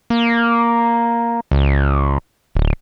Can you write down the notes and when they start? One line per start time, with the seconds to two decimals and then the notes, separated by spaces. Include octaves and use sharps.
0.10 A#3
1.51 C#2
2.55 D1